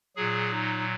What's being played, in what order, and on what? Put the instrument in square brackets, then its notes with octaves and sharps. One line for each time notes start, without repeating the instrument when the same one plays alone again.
[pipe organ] A#2 F#3 G#4
D#4